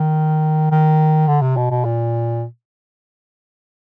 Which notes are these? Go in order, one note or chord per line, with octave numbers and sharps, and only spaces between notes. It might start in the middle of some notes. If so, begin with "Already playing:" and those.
Already playing: D#3
D#3
D3
C3
B2
B2
A#2